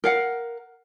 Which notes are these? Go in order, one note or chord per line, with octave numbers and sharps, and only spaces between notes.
A#4 F5 F#5